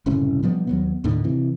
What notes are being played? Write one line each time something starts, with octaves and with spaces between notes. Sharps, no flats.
F#1 C2 A2 C#4
B2 F3 G3 B3
D#2 F#3 B3
D#2 A2 D3 D#3
C3 E3